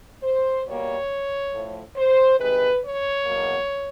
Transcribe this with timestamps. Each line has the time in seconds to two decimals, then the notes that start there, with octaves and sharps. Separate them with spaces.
0.23 C5
0.66 B2 G3 A#3 C#5
1.53 A2 F3 A3
1.96 C5
2.39 C3 D#3 G#3 B4
2.83 C#5
3.26 E2 B2 F#3 A#3